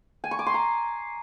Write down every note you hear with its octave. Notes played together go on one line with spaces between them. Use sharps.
G#5
C#6
D6
C6
A#5